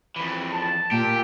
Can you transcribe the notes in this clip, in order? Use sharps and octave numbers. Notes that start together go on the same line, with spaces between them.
F2 E3
A5
A#2 G4